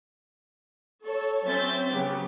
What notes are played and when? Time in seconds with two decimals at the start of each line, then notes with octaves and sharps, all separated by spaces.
1.03 A4 C#5
1.43 F#3 C4 C#4 E5 G6 A6
1.90 C#3 F#3 B3 G4